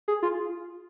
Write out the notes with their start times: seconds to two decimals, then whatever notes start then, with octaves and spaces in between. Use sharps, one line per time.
0.08 G#4
0.23 F4